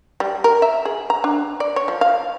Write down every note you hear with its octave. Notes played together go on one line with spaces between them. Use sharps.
G3
A#4
E5
G#4
A#5
D4
D5
C#5
F3
F5